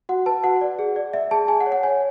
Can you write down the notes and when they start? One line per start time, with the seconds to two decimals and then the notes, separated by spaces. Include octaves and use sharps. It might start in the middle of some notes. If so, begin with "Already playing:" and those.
0.09 F#4 F#5
0.26 B4 A5
0.44 F#4 F#5
0.61 D5
0.79 G#4
0.96 D5
1.13 D5 E5
1.31 G#4 A5
1.48 G#4 G#5
1.60 F#5
1.66 C#5
1.72 F#5
1.83 C#5 G#5